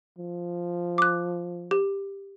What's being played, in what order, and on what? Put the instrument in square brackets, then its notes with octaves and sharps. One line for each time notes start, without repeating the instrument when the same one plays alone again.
[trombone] F3
[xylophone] D6 F#6
G4